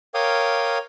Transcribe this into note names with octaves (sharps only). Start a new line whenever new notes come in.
A#4 C#5 F5 G5 D6 D#6